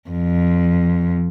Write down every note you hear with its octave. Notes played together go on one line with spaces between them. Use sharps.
F2